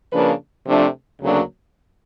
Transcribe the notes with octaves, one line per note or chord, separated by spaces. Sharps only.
C#3 F3 A#3 D4 B4
C3 F3 A3 D4
D2 C#3 F#3 A#3 D4